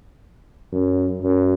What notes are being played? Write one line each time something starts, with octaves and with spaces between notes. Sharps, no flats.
F#2
F#2